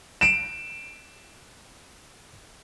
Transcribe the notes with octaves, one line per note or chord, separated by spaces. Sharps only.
D7 E7